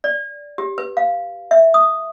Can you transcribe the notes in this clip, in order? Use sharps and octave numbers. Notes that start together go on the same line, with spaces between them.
D5
G4
B4
F5
E5
D#6